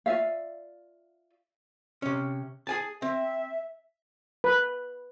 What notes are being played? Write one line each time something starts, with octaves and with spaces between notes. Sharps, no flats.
F4 D5 E5 F5
C3 C#4
G#4 G#5 A5
C4 E5
B4